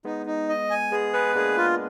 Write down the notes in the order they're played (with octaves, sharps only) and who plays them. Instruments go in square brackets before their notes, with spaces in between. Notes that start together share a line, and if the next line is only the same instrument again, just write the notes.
[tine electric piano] G#3 B3 [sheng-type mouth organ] D#4
[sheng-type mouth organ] D#4
D#5
G#5
[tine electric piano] G#3 B3 [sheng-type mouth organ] G#4
[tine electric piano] G#3 B3 [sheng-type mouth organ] B4
[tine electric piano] A#3 D4 [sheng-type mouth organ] G#4
[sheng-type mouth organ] F4